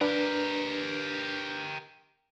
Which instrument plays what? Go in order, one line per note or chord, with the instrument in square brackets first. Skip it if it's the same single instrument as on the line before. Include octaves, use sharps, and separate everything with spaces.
[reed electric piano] D4 B4 [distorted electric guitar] G4 A#4